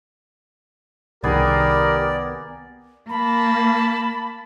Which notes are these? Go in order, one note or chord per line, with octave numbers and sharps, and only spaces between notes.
C2 D#3 B3 G4 G#4 A#4 D5
A#3 A5 B5